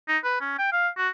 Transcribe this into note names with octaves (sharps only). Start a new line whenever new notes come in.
D#4
B4
C#4
G5
F5
F#4